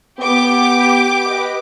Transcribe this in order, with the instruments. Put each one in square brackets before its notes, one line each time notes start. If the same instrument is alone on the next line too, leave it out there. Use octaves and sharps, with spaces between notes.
[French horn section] B3 [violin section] G4 D6
[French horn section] B4 D#5